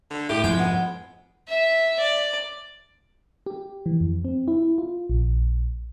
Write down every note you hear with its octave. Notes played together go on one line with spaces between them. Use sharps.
D3
A2 G4
F2 G#2 B2 F3 G#3 G5
B3
E5
D5
G4
E3
F2
C4
E4
F4
A#1